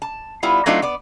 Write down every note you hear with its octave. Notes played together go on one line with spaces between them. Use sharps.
A5
G3 B3 E4 F4
F#3 A3 C4 D4 D#4 F4
B3 D5